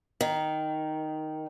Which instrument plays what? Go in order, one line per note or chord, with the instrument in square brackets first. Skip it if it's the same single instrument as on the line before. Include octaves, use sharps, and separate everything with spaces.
[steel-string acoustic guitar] D#3